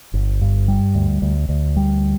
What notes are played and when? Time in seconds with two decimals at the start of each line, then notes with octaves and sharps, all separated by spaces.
0.14 G1
0.41 G2
0.68 G3
0.95 D2
1.22 D2
1.49 D2
1.76 G3